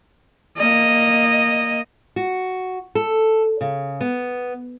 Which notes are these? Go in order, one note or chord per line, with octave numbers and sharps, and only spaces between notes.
A#3 D#5
F#4
A4
C#3
B3